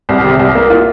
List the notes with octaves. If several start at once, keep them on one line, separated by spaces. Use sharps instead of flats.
C2
C3
C2
A#3
F4